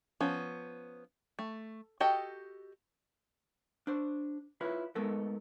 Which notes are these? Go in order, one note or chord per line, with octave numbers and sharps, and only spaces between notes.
F3 B3 C#4
A3
F#4 G4 A4 D#5 G5
D4 C5
E4 F4 B4 C#5
G#3 A3 B3 D#4 A4 A#4